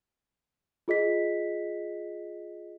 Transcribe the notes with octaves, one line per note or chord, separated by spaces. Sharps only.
F4 G#4 D#5 B6